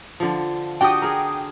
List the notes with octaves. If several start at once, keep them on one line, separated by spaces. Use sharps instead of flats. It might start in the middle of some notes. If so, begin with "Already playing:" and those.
D3 F3
D4 F#4 G4 G5 D#6
G#4 A#4